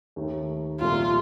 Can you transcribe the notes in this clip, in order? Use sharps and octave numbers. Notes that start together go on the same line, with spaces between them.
D#2 D#3 A3
C2 A#2 F3 A3 F4